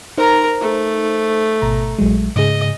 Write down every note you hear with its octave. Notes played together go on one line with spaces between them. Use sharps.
D#4 A#4 C5 A#5
A3
G#1 B2 A#5
A#1 F#3 G#3
G#2 C#3 G#4 D#5